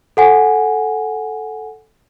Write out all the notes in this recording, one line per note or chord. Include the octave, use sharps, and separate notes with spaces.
A4 F#5 G#5